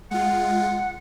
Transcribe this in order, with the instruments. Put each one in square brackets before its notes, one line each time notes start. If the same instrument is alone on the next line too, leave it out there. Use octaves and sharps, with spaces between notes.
[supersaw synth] G#3 F4 [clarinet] F#5